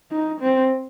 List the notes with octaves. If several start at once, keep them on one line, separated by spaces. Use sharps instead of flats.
D#4
C4